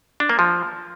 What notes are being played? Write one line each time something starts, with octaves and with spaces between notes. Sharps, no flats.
D4
A#3
F3